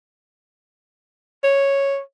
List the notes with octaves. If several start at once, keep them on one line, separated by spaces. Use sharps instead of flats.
C#5